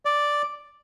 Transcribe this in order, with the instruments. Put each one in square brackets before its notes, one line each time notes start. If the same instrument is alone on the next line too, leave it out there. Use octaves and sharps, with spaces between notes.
[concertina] D5